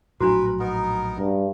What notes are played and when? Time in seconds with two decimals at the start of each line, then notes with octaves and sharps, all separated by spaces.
0.20 A#1 A2 F#3 D4 F#4 A#4 B4
0.59 B3 D#4 A#4
1.19 G2